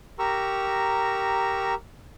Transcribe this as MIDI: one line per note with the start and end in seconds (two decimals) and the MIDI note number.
0.19 1.74 67
0.19 1.74 70
0.19 1.74 82
0.19 1.74 85
0.19 1.74 88